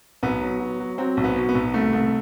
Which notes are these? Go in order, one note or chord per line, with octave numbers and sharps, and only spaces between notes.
B1 B3
F#3
F#3
F#3
F#3 C4
B1
B3
B2
B3
B1
C2 A3
C2